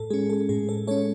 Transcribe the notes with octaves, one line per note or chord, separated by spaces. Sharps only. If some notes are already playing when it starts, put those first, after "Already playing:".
Already playing: A2 A4
G#3 C#4 G#4
A4
A2 G#4
A4
G#3 C#4 A4 C#5